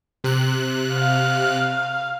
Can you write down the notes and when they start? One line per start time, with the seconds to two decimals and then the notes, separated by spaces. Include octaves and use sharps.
0.24 C3 F#6
0.94 F5